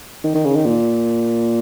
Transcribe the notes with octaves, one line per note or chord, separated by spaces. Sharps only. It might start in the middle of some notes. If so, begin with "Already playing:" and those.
D#3
D#3
C#3
D#3
A#2